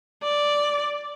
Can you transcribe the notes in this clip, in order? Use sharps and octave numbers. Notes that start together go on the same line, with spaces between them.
D5